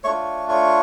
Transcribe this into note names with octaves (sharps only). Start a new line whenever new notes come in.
A3 D4 F4 C#5 C#6
C#5 C#6